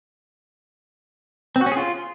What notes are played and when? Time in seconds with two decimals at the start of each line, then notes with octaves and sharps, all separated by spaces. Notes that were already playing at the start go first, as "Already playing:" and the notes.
1.56 C4
1.61 F#4
1.66 C#4
1.72 G#4
1.77 F4